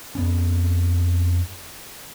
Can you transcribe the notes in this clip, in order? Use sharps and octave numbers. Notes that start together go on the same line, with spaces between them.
F2 B3 C#4